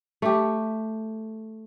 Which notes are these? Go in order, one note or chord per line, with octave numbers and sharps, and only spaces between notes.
A3 G4